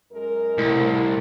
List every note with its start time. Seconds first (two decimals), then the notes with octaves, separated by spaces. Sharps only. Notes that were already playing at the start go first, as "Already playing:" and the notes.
0.12 F#2 G#3 A#4
0.58 C2 A2